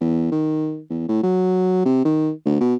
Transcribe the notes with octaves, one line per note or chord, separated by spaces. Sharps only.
E2
D#3
E2
A2
F#3
C3
D#3
D2
B2